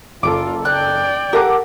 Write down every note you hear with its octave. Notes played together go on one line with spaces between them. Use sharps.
F#1 F4 A4 D6
D5 G5 F#6
G4 A4 A#4 F#5 D6